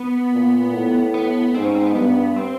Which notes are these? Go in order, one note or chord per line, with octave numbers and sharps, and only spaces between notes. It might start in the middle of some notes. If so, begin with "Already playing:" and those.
Already playing: B3
A#2
A2
B3
G#2 C4
C#4
C4
B3
G2 B3
C4